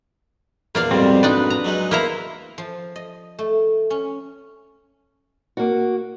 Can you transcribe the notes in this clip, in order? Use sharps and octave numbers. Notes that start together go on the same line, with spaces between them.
E2 A#2 A#3 D4 D5 F5
F2 G#2 B2 G3 C4
D4 D#4 B4 D5
A#5
F#3 G#3 D#4
A#3 B3 E4 C5 A#5
F3
D#5
A3
C#4
A#3 F#4